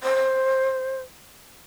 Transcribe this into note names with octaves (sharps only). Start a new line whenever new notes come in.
C5